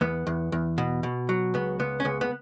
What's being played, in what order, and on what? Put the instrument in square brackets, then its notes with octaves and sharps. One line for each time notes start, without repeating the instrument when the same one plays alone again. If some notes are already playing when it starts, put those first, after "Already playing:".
[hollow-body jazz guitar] E2 B3
E2
E2
B2
B2
F#3
C#2 B3
C#2 B3
C#4
C#2 B3
B3